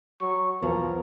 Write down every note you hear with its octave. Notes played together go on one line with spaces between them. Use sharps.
F#3 C#6
B1 E2 F3 F#3 B3 A#4